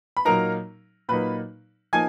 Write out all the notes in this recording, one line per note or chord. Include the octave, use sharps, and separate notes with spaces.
B5
A#2 F#3 A#3 D#4 A#4 A#5
A#2 F#3 A#3 D#4 B4 B5
F3 A#3 D#4 G#5 G#6